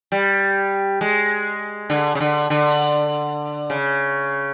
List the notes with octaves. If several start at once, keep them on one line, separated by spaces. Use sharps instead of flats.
G3
G#3
D3
C#3
D3
D3
C#3